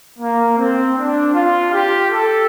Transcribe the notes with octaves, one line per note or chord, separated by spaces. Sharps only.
A#3
C4
D4
F4
G4
A4